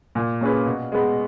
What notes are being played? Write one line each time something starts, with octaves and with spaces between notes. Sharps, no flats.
A#2
A#3 C#4 G#4 B4
B2
G#3 B3